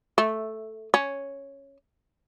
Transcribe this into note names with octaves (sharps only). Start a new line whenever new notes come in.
A3
C#4